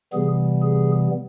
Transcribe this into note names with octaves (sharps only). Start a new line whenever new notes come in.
C3 E3 G3 B3 G#4
G#4